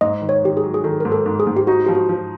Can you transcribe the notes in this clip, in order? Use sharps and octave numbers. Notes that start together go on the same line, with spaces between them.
G#2 D#5
D#3
C#5
D#3 G4
G#4
F#3
G#4
D#3 A4
G#2 A#4
A4
G#2
G#4
G#2
G4
D#4 F#4
F3 G4
F#4
F3